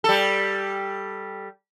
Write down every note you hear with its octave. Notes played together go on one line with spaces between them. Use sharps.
G3 A4